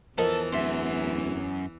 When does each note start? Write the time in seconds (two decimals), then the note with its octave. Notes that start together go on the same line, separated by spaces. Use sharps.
0.18 E2 E3 F3 A4 A#4 D#5
0.52 D1 F#2 E5 C6